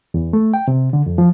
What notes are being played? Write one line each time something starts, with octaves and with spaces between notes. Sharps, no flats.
E2
A3
G5
C3
D3
F2
F3